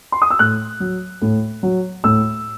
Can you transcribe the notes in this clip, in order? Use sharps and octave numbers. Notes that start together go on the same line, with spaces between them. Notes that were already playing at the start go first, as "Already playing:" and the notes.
C6
D#6
E6
A2 F#6
F#3
A2
F#3
A2 E6